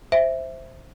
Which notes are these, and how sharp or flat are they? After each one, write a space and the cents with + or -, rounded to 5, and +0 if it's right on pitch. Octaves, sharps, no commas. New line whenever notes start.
C5 +0 E5 +0